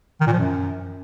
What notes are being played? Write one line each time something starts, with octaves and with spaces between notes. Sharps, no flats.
D#3
A#2
F3
F#2